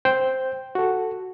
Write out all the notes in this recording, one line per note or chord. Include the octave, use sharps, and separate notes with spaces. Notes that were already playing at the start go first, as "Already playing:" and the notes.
C5 G5 G6
F#4 A4